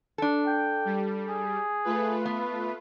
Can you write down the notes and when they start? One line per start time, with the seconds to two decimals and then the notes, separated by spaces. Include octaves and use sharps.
0.18 D4 A4
0.47 G5
0.85 G3
1.29 G#4
1.84 A3 F4 B4
2.25 B3